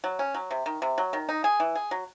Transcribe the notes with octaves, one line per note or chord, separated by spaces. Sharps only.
F#3
C#4
F#3
C3
D#3
C3
F#3
D#3
D#4
G#4
E3
G#4
F#3